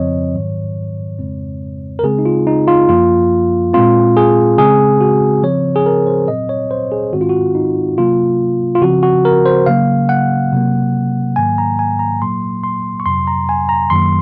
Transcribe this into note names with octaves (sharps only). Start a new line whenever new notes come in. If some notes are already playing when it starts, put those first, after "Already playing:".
Already playing: F2 C#3 F3 C4 C#5 D#5
G#2 D#3 F#3
F2 C#3 G#3 C4
A#4
C#3 G#3 C4 G#4
D#4
F4
D#4
F4
F#2 F3 A#3 F4
A#2 G#3 C4 F4
G#4
C#3 G#3 C4 G#4
F#4
C#3 F3 C4 C#5
G#4
A#4
C5
A#2 F#3 C4 D#5
C#5
C5
G#4
G#2 D#3 G#3 C4 F#4
F4
F#4
D#4
C3 F#3 A#3 F4
F4
C#3 F3 C4 F#4
F#4
A#4
C5
C#3 F#3 A#3 F5
F#5
C3 F#3 A#3
G#2 D#3 F#3 A#3 G#5
A#5
G#5
A#5
A#2 F#3 A#3 C6
C6
C#6
F2 C3 F#3 C6
A#5
G#5
A#5
F#2 D#3 F#3 A#3 C6